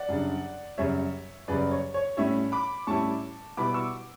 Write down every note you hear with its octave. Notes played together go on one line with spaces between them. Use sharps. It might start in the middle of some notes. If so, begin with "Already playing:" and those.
Already playing: D5 F#5
F#2 C#3 G3 D4
F#2 C#3 G3 C#5 E5
F#2 C#3 G3 B4 D5
C#5
C#5
A2 G3 C#4 E4 C#5 E5
B5 D6
A2 G3 C#4 E4 A5 C#6
B2 G3 B3 E4 B5 D6
C#6 E6